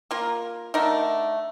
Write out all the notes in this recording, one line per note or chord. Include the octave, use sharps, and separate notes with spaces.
A#3 F4 A#4
D3 A3 D#4 A#4